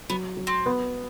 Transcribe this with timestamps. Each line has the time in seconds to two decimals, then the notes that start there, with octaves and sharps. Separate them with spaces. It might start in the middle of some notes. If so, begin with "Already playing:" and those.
0.10 F#3 B3
0.37 F#3
0.47 C4
0.66 B3